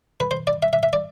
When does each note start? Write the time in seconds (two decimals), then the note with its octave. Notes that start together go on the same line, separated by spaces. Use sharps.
0.20 B4
0.31 C5
0.47 D5
0.63 E5
0.73 E5
0.83 E5
0.93 D5